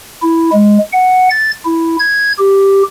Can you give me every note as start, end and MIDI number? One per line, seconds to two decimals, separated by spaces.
0.22 0.50 64
0.53 0.78 56
0.93 1.29 78
1.31 1.51 93
1.65 1.96 64
1.99 2.32 92
2.39 2.83 67